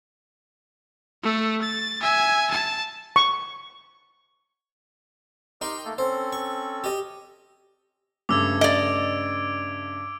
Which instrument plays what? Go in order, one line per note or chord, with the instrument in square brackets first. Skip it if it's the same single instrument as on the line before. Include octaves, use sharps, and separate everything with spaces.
[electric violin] A3 A4
A6
E5 G#5
A5
[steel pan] C#6
[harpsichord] D#4 G5 C6 [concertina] G4 A#4
[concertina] A3 A#3 A4
[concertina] C4 C#4 A4 [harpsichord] C5
[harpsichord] C#6
G4 D#5
[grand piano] G2 C#3 A3 [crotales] D6 E6 G#6
[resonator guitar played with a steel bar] D5 D#5 [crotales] D7